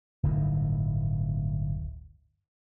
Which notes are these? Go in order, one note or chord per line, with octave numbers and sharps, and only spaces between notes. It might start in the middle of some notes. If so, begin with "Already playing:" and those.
D1 G1 A2 D#3